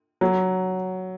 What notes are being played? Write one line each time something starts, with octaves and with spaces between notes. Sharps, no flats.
F#3